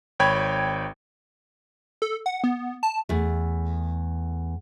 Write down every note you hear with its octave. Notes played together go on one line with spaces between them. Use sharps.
G#1 C#5 G5 B5 G#6
A4
F#5
B3
A5
E2 A3